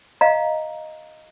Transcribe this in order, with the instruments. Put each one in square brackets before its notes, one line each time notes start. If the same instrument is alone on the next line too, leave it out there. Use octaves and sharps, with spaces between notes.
[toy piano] D#5 F5 A#5